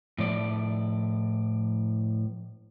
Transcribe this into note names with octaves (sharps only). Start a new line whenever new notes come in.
A2 F3 D5